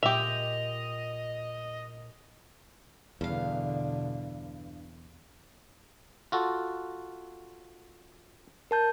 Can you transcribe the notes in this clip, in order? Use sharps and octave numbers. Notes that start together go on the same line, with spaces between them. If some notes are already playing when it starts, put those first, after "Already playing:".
A#2 G#3 G4 D#5 E5 G5 F7
E2 G2 B2 D3 F5
F4 F#4 A4
A#4 A5 G6